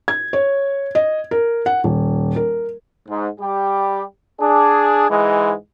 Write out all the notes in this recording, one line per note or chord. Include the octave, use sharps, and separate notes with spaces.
G#6
C#5
D#5
A#4
F#5
D#1
A#4
G#2
G3 G4
D4 G#4
G#2 E3 G#3